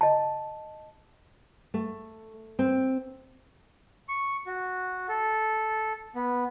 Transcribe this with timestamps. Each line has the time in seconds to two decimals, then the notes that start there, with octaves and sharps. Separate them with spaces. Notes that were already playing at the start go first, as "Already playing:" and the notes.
0.01 D#5 A5
1.74 A3
2.59 C4
4.09 C#6
4.47 F#4
5.08 A4
6.15 B3